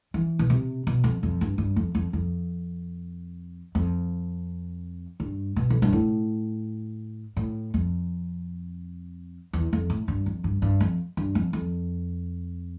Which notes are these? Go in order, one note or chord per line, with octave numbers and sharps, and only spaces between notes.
E3
B2
C3
B2
F2
F2
G2
G2
F2
F2
F2
F2
G2
B2
F2
G2
A2
A2
F2
E2
F2
A2
G2
F2
G2
G2
F2
G2
F2
F2